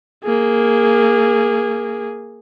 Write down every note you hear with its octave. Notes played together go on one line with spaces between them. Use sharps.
A#3 G#4